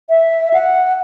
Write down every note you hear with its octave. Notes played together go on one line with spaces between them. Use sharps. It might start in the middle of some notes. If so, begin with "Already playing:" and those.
E5
F#5